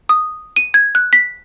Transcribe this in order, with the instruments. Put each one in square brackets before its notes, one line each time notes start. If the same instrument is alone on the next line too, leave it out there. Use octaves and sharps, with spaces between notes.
[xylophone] D#6
D#7
G#6
F#6
B6